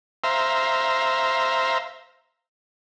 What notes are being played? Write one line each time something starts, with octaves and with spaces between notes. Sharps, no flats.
C5 E5 F5 A#5